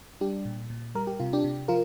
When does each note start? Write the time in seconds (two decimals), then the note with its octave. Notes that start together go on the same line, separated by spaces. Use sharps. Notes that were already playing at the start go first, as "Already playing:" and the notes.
0.21 G3 D4 G4
0.45 A#2
0.70 A#2
0.95 G3 A#4
1.07 G4
1.19 C3 F4
1.33 D4 G4
1.44 C3
1.68 F3 F4 A#4